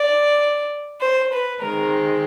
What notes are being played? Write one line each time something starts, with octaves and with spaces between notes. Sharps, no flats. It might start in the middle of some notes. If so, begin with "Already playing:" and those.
Already playing: D5
C5
B4
D#3 G#3 C4 A#4